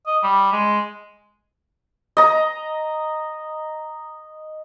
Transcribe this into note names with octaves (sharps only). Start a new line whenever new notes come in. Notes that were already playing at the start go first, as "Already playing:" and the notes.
D#5
G3
G#3
D#5 A#5